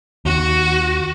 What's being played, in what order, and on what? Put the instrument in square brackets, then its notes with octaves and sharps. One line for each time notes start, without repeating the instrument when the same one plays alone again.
[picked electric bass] D#2 [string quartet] F#4